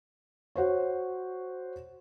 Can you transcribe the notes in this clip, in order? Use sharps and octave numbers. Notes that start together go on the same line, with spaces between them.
F#4 C5 C#5